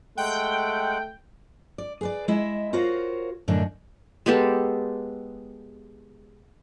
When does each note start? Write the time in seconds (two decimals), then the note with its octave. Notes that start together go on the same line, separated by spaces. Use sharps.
0.17 G#3 A3 F#5 G5
1.78 D5
2.01 G#4 B4 D5
2.28 G#3 E4 D#5 E5
2.73 F4 F#4 A#4 C5 C#5 F5
3.48 F#2 A2 D3 D4 D#4
4.26 G#3 B3 G4 A4